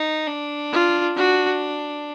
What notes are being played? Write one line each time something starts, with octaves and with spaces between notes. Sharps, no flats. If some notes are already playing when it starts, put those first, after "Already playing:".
Already playing: D#4
D4
F4
D4 F#4